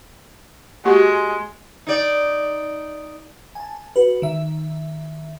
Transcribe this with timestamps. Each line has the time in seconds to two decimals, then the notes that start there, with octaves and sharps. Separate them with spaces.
0.85 G#3 A#3 F#4 G4
1.87 D#4 D5
3.55 G#5 A5
3.96 F#4 B4
4.22 D#3 E5